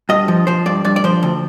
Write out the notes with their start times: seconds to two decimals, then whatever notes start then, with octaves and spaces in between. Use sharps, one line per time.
0.09 G2 D#5
0.28 F3
0.47 F3 C5
0.66 G2 D5
0.85 G2 D5
0.96 D5
1.04 F3 C5
1.23 D2